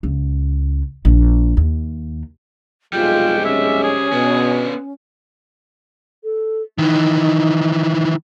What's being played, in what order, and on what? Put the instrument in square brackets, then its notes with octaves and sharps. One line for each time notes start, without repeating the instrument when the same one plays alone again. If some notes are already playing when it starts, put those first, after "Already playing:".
[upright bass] C#2
A#1
D#2
[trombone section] B1 F2 G#3 [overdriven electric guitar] G3 C4 [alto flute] F4 [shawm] G5
[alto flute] C#4 [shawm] E5
[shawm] G#4
[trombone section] B2 [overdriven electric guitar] B3 D4
[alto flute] A4
[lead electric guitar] D#3 E3 [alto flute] D#4